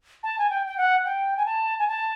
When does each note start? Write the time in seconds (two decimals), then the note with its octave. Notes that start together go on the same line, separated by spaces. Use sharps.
0.23 A5
0.39 G#5
0.50 G5
0.66 G5
0.77 F#5
1.05 G5
1.37 G#5
1.46 A5
1.79 G#5
1.88 A5